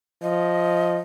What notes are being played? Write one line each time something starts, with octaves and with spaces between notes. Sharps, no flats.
F3 D#5